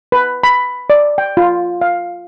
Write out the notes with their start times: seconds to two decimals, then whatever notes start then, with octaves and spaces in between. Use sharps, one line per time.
0.12 B4
0.43 B5
0.90 D5
1.18 G5
1.37 F4
1.81 F5